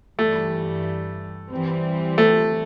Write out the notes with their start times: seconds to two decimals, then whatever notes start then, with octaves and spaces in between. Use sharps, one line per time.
0.19 G2 E3 G3 A3
1.51 E3 G3 C4
2.18 A3